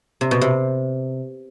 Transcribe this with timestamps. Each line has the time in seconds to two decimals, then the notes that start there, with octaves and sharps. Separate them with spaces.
0.21 C3
0.31 B2
0.41 C3